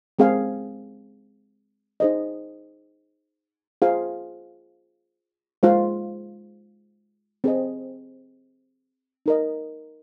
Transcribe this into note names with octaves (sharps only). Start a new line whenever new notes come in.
G#3 C4 G#4 F5
D#4 G#4 C5 D#5
F4 G#4 C5 F5
G#3 F4 C5 F5
C4 G#4 C5 D#5
D#4 A#4 D#5